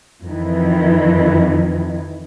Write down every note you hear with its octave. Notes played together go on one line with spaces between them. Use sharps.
F2 D#3 E3